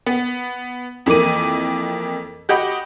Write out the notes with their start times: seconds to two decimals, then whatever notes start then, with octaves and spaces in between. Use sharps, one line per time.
0.06 B3
1.06 F2 E3 A#3 D6 D#7
2.49 F#4 G4 D#5 B5